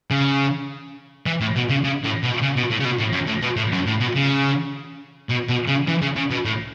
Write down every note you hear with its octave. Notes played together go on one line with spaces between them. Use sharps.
C#3
E3
A2
B2
C#3
C#3
A2
B2
C#3
B2
A2
C#3
B2
A2
F#2
A2
B2
A2
F#2
A2
B2
C#3
B2
B2
C#3
E3
C#3
C#3
B2
A2